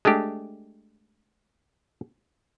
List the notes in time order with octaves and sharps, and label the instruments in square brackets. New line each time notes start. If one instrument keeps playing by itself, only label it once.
[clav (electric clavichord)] G#3 A3 D4 G4